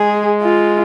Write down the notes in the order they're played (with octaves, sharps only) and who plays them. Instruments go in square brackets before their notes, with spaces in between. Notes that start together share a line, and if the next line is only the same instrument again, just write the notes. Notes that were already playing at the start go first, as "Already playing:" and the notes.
Already playing: [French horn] G#3 [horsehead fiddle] G#4
[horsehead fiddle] F4